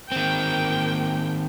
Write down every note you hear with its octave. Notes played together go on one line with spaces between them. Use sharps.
D#3 A#3 C4 G5